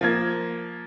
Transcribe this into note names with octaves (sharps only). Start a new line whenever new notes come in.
F3 A#3 G#6